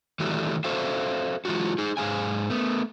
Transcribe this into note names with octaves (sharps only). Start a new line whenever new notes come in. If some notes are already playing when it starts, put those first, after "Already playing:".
D#3 E3 G3 A3 F#4
F#4 A4 C5 E5 F5
E3 G#3 C4 F4 F#4
D#4 G#4
G#2 G#4 F5 G#5
A3 B3